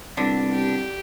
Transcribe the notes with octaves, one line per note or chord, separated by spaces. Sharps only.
C2 D3 B3 D4
G4